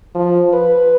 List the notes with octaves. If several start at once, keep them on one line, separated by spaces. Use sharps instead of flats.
F3
B4